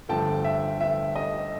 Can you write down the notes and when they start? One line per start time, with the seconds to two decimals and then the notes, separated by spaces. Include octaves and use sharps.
0.09 G1 G2 D3 F3 A3 G5 A5
0.44 E5
0.81 E5
1.16 D#5